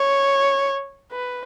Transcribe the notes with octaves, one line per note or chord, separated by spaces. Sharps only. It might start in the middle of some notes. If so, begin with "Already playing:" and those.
Already playing: C#5
B4